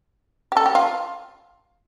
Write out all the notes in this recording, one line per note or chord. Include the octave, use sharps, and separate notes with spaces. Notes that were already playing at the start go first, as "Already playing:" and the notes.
G4
A4
G4
F4